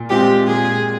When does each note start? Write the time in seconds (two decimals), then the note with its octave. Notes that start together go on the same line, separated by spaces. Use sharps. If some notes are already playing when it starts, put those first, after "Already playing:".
Already playing: A#2
0.10 G#3 C4 F4 G4
0.48 A#2 G#4